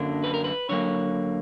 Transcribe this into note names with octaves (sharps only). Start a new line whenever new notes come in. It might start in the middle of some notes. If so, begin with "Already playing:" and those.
Already playing: F#2 D3 F#3 A#3 D4
B4
A#4
B4
D3 F#3 A#3 C#5